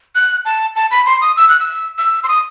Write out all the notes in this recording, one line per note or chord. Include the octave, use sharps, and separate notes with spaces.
F#6
A5
A5
B5
C6
D#6
E6
F#6
E6
E6
C6
D#6